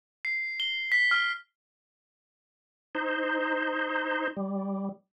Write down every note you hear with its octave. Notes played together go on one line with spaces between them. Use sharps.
C7
G7
B6
F6
D#4 C5
G3